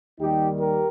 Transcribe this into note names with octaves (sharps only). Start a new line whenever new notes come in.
D#2 D#3 G3 D#4 G4
G4 A#4